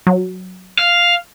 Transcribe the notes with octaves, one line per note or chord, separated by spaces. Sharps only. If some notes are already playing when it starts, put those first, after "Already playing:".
F#3
F5